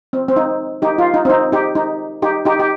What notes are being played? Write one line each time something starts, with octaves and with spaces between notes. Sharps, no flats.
C4
C4
D#4
D#4 G4
F4
D#4
C4
D#4
D#4 G4
D#4
D#4 G4
D#4 G4
G4